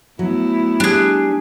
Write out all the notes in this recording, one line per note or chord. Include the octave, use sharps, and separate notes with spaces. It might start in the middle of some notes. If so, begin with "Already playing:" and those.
F#3 A3 B3 E4
G3 D4 G#4